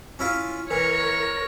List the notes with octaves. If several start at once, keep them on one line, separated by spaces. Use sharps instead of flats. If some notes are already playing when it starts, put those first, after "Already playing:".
C#4 E4 F4
E3 A#4 C#5